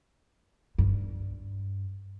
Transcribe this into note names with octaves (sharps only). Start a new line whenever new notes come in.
G2